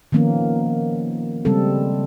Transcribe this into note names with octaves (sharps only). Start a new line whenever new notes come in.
D#3 F3 A#3 B3 C#4
C#3 G3 G#3 C4 A4